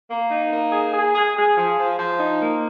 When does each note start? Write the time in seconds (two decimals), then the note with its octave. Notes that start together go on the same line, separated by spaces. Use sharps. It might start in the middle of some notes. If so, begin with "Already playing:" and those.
0.11 A#3
0.30 D#4
0.52 A#3
0.72 G#4
0.94 G#4
1.15 G#4
1.36 G#4
1.57 F3
1.78 F3
1.99 F3
2.20 D#4
2.40 A#3